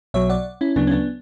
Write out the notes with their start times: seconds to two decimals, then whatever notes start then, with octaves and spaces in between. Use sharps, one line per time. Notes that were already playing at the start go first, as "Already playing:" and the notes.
0.14 B1 B2 F#3 C#5 E5
0.30 D5 F#5
0.61 C#4 E4
0.76 D2 C#3 F#3 B3 D4
0.87 C#4
0.91 B3 D4